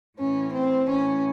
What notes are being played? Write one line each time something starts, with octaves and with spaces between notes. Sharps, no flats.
A2 E3 C#4
C4
A2 E3 C#4